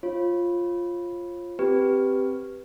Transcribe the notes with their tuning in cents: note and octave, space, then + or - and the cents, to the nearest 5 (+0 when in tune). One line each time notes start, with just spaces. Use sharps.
F4 +0 C#5 -40
C4 +0 G4 +0 B4 +0